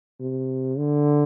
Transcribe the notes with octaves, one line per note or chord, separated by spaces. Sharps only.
C3
D3